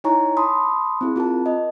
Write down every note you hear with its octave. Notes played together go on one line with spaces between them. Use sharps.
D#4 E4 C#5 G#5 A#5 C#6
A5 B5 C6 D#6
C4 E4 G#4
C4 F4 A#4 A5
D#5